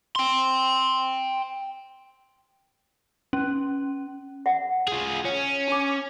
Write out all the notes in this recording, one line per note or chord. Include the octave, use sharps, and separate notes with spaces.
G5 C6
C#4
E5 F#5
F4 G#4
C#4
D4 D6